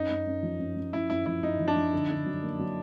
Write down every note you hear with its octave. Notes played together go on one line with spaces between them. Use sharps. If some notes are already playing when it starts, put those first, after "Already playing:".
Already playing: F#2 D#4
F#2
F#2
F3
F#2
F#2
F#2 E4
F#2 E4
F3 E4
F#2 D#4
F3
D4
F3
D3
D3
F#3
A#3
F#3